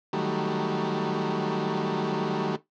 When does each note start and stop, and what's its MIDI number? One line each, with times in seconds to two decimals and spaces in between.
0.13 2.56 51
0.13 2.56 54
0.13 2.56 55
0.13 2.56 57